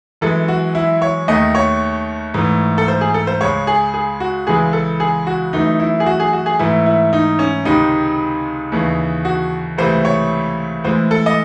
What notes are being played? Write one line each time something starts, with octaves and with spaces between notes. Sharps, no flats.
F#2 E3 G#3 A4
F#4
E4
C#5
D#2 D#3 A3 D#5
C#5
G#2 E3 A3
A4
C5
G#4
A4
C5
C#2 C#3 G#3 C#5
G#4
G#4
F#4
C#2 C#3 E3 G#3 G#4
A4
G#4
F#4
F#2 E3 A3 D#4
E4
G#4
F#4
G#4
F#4
G#4
G#2 E3 A3 E4
E4
D#4
C#4
C#2 C3 D#3 G#3 D#4
D#2 C#3 E3
F#4
C#2 C3 E3 A3 C5
C#5
A2 E3 G#3 C5
A4
D#5